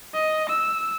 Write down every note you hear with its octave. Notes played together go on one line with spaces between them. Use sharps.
D#5
E6